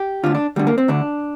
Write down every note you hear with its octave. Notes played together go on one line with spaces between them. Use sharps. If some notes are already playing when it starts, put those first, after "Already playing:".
Already playing: G4
D2 D3 F4
D4
D2 D3 G3
A#3
C4
D2 D3 D4